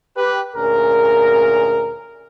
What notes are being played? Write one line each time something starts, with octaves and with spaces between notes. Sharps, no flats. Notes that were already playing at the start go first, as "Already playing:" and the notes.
G4 B4
D2 A#2 C#4 G#4 A#4